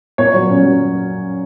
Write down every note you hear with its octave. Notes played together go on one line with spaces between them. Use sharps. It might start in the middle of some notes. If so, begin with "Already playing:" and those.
A#2 C#5
F#3
C#4
F#3